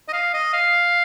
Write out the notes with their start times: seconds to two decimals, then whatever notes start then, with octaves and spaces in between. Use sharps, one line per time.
0.08 D#5
0.13 F5
0.34 D#5
0.53 F5